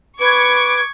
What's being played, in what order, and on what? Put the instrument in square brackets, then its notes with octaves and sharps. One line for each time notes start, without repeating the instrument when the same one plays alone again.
[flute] B4 [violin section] C#6 G#6 [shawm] D6